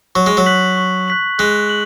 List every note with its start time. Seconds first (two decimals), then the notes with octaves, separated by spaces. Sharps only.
0.15 F#3 C#6
0.26 G#3
0.37 F#3
0.46 F#6 B6 F#7
0.77 C#6
1.08 F#6 B6 F#7
1.38 G#3 F#6
1.69 F#7